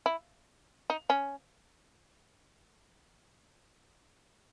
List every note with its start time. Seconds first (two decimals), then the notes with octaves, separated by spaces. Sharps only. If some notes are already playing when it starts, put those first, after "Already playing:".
0.06 E4
0.90 D#4
1.10 C#4